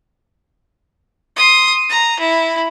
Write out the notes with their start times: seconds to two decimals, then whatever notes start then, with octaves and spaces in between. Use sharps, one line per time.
1.36 C6 D#6
1.90 A#5
2.20 E4